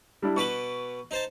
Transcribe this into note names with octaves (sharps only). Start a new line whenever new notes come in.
G3 D4 E4
B2 B4 C#6 D6 F#7
D#4 C5 A5